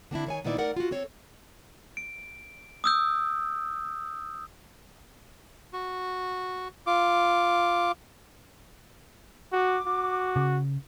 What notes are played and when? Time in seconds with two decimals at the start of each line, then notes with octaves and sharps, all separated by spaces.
0.11 D3 C4 D4 E4
0.26 D#3 C#5 G#5
0.44 A#2 D#3 B3 D#4 E4 D5
0.58 A3 D#4 A#4 D5 F#5
0.76 F4 F#4
0.91 C4 A4 C#5
1.97 D7
2.84 D#6 E6 G6
5.73 F#4
6.86 F4 D6
9.53 F#4 D6
9.87 F#4
10.36 C#3